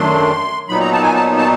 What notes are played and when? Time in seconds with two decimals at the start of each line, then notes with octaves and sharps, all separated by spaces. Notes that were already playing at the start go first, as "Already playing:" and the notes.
Already playing: F#2 D#3 F#3 A3 D4 C6
0.69 A#2 F#3 B3 D#4 B5
0.80 A#5
0.92 A5
1.03 G#5
1.15 A5
1.38 A5